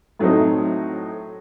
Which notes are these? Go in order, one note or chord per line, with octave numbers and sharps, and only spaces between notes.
A2 F#3 A3 C4 D#4